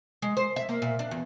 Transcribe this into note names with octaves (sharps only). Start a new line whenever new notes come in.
G#3
C5
E5
A#3
A#2
D4
E2